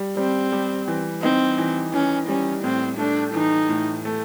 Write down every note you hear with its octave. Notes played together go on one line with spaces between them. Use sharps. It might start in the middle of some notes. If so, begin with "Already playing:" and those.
Already playing: G3
G3 C4
G3
E3
C4 D#4
E3
E3 C#4
G3 C#4
A2 C4
A3 D4
E3 D#4
A2
A3